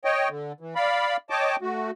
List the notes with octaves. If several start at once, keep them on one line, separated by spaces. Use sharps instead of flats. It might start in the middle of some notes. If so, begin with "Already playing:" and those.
C#5 D#5 G5
D3
E3
D5 F5 B5
C#5 D#5 G5 A5 D6
A3 F#4